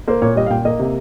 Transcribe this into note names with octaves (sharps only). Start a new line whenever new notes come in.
A#3 C5
A#2 C#5
G3 D#5
F5
A#2 G5
A#3 D#5
C3